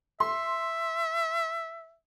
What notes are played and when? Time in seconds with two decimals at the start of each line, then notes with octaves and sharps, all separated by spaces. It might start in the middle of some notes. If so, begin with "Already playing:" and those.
0.20 E5 C6